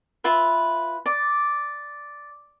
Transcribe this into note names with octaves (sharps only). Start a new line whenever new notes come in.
F4 B4 E5 B5
D5